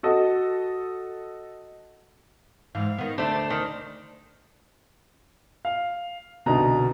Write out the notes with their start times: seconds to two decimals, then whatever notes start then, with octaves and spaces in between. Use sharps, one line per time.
0.03 F#4 A4 D#5
2.75 G#2 E3 F5
2.98 D#3 B3
3.18 D2 A3 D4 C5
3.50 D#3 C5
5.65 F5
6.46 C2 B2 D3 D#4 A#5